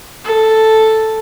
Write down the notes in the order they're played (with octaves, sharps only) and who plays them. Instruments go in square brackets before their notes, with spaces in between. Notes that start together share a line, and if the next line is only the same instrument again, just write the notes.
[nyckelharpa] A4